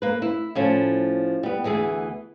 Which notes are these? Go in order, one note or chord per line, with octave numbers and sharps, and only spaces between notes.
A#3 B4
E4
A2 F3 C#4
G3 B3
D2 E3 B3 G#4